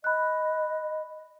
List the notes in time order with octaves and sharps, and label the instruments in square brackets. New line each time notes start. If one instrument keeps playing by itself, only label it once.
[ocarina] D#5 [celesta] B5 F#6